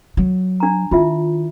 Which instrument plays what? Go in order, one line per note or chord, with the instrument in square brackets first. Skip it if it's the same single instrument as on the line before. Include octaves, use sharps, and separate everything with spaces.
[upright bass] F#3
[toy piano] D4 A#5
[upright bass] D#3 [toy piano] E4 F4 E5